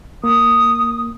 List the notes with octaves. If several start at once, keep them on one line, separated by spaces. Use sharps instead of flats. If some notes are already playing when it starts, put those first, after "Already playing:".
A#3 D#6